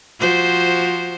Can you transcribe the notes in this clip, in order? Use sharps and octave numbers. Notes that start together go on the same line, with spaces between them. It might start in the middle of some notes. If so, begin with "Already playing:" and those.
F3 F#4 C5